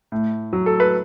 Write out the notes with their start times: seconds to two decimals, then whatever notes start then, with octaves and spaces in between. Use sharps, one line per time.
0.12 A2
0.53 F#3
0.66 A4
0.80 B4